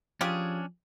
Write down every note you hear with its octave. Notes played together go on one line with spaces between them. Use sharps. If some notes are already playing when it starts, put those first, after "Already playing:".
F3 C#4 D4 F4 G4 G#4